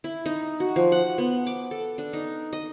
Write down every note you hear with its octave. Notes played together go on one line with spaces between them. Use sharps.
E4
D#4
F#4
F3
F#5
B3
D6
A4
D4
D#4
D#5